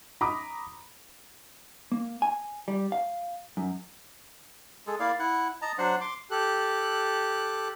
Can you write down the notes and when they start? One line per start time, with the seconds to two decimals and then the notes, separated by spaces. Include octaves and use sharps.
0.21 A#5 B5 D6 D#6
1.92 A#3
2.22 G#5
2.68 G3
2.92 F5
3.57 F#2
4.87 G#3 G#4 A4
5.00 A#3 E4 D5 F5
5.19 E4 F#5
5.62 D#5 A5 A#5
5.78 F#3 D4 C5 F#5
6.01 C6 D6
6.31 G4 A4 F#6